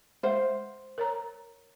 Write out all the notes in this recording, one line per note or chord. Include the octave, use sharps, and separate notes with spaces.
G#3 C5 E5 F#5
A#4 C#5 A#5